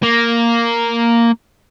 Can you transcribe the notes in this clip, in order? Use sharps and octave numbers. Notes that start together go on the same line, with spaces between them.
A#3